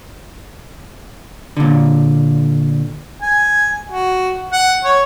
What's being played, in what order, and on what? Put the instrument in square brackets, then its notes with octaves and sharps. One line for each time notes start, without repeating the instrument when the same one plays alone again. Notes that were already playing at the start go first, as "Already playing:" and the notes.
[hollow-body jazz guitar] A#2 D3
[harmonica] G#5
F#4
F#5
C#5